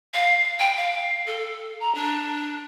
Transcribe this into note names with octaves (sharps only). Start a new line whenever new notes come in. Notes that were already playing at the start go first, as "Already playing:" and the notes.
F5
G5
F5
A4
A#5
D4